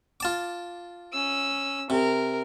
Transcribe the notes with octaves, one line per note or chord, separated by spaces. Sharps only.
F4 A5 D6
C#4 E6
C3 A#4